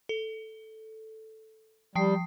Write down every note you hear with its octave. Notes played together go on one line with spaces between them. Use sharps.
A4
F3 G3 G5 C7